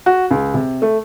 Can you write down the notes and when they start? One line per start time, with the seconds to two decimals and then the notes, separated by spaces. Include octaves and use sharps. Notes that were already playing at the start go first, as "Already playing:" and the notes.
0.06 F#4
0.31 C#2
0.54 C3
0.82 A3